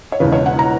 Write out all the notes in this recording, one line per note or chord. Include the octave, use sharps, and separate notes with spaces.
C#5
E1 E2 C#3 B4
C#5
F#5
A#5